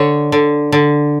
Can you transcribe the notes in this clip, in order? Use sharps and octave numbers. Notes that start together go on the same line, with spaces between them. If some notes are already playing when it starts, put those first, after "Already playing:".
Already playing: D3 C#5
D3
D3